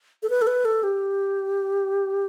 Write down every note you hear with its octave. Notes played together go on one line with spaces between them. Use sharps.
A4
B4
A4
B4
A4
G4